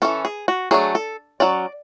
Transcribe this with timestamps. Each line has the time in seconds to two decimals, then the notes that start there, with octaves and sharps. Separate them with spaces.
0.02 E3 A3 C#4 A4
0.25 G#4
0.48 F#4
0.71 F#3 A3 D4 G#4
0.95 A4
1.40 F#3 C#4 D5